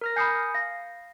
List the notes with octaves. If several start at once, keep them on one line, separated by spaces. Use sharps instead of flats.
A#4 F6 A#6
G#5 B5 D#6 G6 C7 C#7
F5 A#6